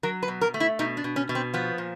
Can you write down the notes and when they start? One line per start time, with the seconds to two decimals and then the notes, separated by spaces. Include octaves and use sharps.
0.03 F#3 A#4
0.23 B4
0.28 B2
0.41 A#4
0.54 A3
0.60 E4
0.79 B2 D#4
0.97 D4
1.04 B2
1.16 C#4
1.29 B2
1.35 C4
1.54 F3 B3
1.78 A#2